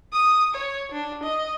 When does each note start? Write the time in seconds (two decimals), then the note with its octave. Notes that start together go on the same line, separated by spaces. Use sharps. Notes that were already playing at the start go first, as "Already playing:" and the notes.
0.13 D#6
0.54 C#5
0.92 D4
1.23 D#5